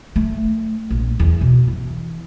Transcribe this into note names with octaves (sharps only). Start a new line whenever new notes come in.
A3
A#1
E2
B2
E3